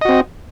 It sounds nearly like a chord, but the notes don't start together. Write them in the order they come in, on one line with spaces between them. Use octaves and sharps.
D#5 F#4 C4